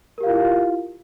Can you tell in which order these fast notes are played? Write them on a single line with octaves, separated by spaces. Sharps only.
A#4 G4 F5 F4 E4